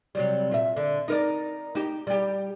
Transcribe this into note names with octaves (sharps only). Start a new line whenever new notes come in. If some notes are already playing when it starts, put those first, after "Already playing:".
C3 F#3 G3
A#2 E5
D3
D#4 A#4 D5
D#4 G4
G3 G4